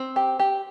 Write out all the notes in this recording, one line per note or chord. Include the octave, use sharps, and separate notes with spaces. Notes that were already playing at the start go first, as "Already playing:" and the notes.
Already playing: C4
G4
G4